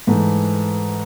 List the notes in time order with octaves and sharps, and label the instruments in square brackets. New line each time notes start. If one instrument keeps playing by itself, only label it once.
[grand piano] G#2 E3 A3